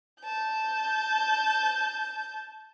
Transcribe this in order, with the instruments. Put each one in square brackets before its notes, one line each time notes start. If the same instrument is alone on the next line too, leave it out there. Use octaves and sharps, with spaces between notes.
[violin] A5 G6